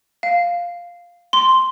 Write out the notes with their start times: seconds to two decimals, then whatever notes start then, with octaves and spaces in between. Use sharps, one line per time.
0.23 F5
1.33 C6